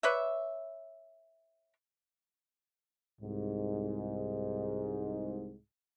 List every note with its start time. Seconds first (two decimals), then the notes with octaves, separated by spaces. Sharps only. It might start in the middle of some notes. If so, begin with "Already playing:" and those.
0.03 B4 C#5 D5 E5
3.20 C2 G#2